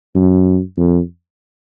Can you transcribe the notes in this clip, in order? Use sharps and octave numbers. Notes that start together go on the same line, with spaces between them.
F#2
F2